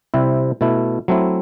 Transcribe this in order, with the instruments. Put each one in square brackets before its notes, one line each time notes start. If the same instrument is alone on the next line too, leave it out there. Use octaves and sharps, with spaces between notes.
[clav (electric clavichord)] C3 G3 C4 E4
B2 A3 E4
F#3 A3 C4 E4